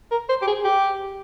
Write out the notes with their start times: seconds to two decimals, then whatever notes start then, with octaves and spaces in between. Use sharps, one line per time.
0.11 A#4
0.29 C5
0.42 G4
0.47 G#4
0.64 G4